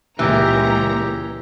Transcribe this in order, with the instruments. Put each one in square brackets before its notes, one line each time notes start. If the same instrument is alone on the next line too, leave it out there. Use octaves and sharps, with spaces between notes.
[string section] C#2 A#2 A#5 [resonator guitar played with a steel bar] E3 [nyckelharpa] G4